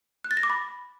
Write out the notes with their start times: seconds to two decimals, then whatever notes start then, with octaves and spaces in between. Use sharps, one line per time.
0.24 F#6
0.31 A6
0.37 A#6
0.43 D6
0.50 B5